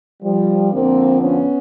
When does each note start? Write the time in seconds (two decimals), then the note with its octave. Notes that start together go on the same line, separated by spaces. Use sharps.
0.23 F3 G3
0.72 F2 D3 F3 A#3 C4
1.21 B3 C#4